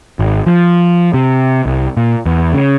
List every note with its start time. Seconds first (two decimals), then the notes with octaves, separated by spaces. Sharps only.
0.19 G#1
0.46 F3
1.14 C3
1.65 C2
1.97 A#2
2.26 E2
2.54 C#3